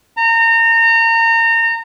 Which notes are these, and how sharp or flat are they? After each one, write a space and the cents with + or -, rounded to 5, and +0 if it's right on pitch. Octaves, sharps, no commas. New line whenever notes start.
A#5 -30